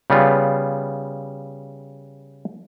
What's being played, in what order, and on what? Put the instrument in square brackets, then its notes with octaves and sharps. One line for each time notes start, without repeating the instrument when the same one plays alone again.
[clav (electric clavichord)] C#3 G3 B3 F4